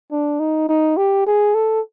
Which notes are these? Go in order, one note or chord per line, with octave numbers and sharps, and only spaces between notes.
D4
D#4
D#4
G4
G#4
A4